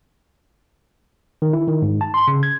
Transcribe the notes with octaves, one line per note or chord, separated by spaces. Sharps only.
D#3
E4
D#3
G#2
A5
C6
C#3
G#6